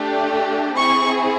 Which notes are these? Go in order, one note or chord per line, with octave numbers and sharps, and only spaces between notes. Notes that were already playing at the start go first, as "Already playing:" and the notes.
Already playing: A3 D4 G4
C4 E4 G#4 C#6